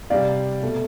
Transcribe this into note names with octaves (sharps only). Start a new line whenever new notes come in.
C3 G3 D5 F5
B2 A3